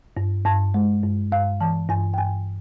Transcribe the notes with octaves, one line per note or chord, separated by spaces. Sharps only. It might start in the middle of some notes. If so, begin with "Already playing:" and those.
G2
G2 A5
G#3
G2
G2 F5
E3 A5
G2 G#5
G5
G2 G#5